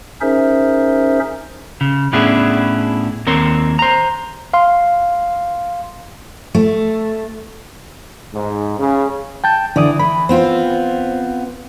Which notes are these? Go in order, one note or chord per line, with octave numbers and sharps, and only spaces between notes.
C#4 D#4 G#4 A#4 C5 E5
C#3
A2 B3 C#4 D4 E4 G#4
D#2 A#3 C4 A#4 C#5 C6
C5 A#5
F5 C6
A3
G#2
C#3
G5 A5 G6
D3 E3 D5 D#6
E3 B5
B3 C4 F4 C5